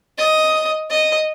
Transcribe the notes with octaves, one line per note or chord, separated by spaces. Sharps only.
D#5
D#5